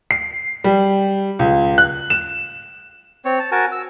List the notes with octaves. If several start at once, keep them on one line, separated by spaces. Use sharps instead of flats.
C7
G3
C#2
F#6
E7
C4 C#5
A5
F#4 A#4 G#5 A5
E6